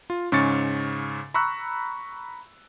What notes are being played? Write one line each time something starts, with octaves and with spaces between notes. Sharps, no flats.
F4
G#2 C#3 C#4 C#6 A6 C#7
A#5 B5 C#6 E6 F#6